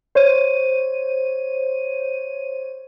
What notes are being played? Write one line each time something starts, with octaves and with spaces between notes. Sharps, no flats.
C5 C#5 D#7